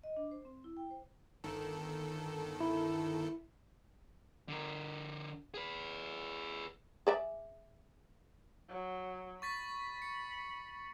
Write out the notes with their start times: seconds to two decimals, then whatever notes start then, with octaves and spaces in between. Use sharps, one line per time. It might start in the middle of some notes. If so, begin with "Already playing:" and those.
0.03 D#5
0.17 D4
0.31 C5
0.45 C4
0.64 E4
0.77 G5
0.91 C5
1.44 G1 D#3 A4
2.61 E4
4.49 D3 A#4
5.54 G#4 B4
7.07 G#4 D5 E5
8.69 F#3
9.42 B5 C#6 A6 B6
10.02 C#7